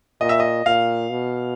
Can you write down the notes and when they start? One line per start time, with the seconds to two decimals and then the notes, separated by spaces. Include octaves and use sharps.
0.21 A#2 D#5
0.29 E5
0.40 D#5
0.66 A#2 F5
1.11 B2